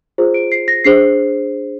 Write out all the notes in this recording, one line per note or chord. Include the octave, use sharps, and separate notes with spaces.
F4 G#4 C5
D7
C7
A#6
D4 G#4 C5 C7